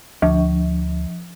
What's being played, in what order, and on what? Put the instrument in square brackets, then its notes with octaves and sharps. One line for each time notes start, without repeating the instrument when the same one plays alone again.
[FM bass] D2 [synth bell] F3